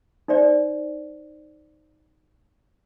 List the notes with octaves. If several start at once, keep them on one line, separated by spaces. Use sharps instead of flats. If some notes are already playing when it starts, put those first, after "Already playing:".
D#4 C5 D5